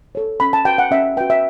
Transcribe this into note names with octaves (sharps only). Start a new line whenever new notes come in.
A4 C#5
C#4 B5
A5
F#4 B4 G5
F#5
C#4 E5
F#4 B4 G5
E5